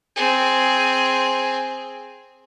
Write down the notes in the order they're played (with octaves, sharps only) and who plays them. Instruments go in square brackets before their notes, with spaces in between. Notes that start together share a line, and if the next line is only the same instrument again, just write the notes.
[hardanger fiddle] C4 G#4